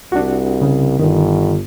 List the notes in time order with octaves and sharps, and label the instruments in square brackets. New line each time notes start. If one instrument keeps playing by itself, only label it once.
[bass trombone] C2 [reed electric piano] D4 F#4
[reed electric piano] C#3
[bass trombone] G1 [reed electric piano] D#3